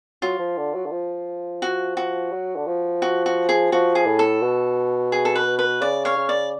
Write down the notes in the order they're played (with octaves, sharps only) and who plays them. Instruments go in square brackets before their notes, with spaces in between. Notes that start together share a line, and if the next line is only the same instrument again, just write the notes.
[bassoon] F#3 [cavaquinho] F4
[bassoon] F3
D3
F#3
D3
F3
[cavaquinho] F#4
F#4
[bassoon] F#3
D3
F3
[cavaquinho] F#4
F#4
G#4
[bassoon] F3 [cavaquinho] F#4
[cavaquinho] G#4
[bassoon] A2
[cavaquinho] A4
[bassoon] B2
[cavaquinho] G#4
A4
B4
B4
[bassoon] C#3 [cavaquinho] D5
[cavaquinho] C#5 F5
[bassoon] C#3
[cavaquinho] D5